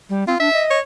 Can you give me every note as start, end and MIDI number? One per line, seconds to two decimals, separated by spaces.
0.10 0.24 55
0.27 0.35 60
0.27 0.38 65
0.40 0.49 62
0.40 0.64 76
0.53 0.78 75
0.70 0.81 73